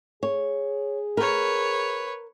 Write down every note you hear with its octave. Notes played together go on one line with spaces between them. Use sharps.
G#4 C#5
A#4 B4 C#5